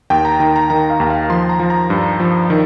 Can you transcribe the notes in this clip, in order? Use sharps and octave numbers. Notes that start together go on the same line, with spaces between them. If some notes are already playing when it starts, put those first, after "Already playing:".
D#2 G5
A#5
D#3 A#5
A#5
D#3 A#5
F5
D#2
F5
F3 C6
A#5
F3
A#5
G2
F3
D#3